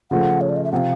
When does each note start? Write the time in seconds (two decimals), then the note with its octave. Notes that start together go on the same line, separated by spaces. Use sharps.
0.11 C#3 F3 A3 F#5
0.41 C#5
0.49 D5
0.56 D#5
0.64 E5
0.72 C3 F3 F5 F#5